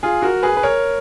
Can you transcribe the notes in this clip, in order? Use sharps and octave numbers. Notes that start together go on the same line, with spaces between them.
F4 G#4
F#4 A#4
G#4 B4
B4
A#4 C#5